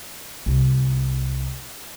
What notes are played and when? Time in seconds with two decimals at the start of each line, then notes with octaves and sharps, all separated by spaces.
0.46 C2